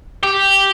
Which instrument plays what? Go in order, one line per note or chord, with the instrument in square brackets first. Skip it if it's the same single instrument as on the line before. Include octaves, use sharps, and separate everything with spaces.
[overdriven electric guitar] G4